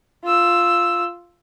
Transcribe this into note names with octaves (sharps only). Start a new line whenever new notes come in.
F4 E6